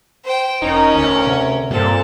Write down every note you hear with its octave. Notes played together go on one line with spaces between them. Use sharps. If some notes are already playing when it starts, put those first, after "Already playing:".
C5 G5
E1 C#4 D#4 A#4
D2
C3
G2 A#2 C4 A4